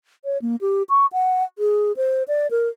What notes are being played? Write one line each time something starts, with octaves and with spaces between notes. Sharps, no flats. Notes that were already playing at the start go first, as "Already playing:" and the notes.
C#5
A#3
G4
C#6
F#5
G#4
C5
D5
A#4